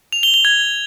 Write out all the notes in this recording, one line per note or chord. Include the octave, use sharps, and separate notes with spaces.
F7
G7
G7
G#6